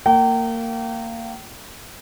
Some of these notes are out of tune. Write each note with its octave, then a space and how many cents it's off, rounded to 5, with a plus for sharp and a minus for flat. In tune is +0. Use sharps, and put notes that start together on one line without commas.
A#3 -25 G5 -35